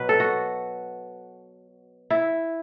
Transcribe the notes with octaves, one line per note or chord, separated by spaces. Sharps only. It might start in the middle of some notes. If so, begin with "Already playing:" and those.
Already playing: B2 F#3 B4
A4
F#4
E4